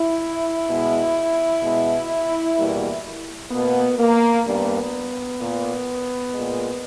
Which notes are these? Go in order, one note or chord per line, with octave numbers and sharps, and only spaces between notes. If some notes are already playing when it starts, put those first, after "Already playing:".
Already playing: E4
B2 G#3
B2 G#3
E2 B2 G3 A#3
B2 A#3 B3
A#3
G2 D#3 G3 A#3 B3
A#2 A#3
A#2 G#3